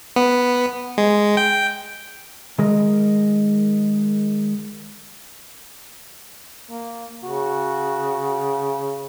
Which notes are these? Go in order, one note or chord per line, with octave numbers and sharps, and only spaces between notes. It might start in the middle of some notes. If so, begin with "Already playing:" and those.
B3
G#3
G5
D#3 G#3 G#4 A#4 D#5
A#3
C#3 F#4